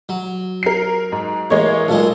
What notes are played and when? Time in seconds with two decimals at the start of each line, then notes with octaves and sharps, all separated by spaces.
0.09 F#3
0.63 A#4 C7
1.12 G#2
1.50 A1 G#3 A#3 C#5
1.88 B1 A#2 G#3 A4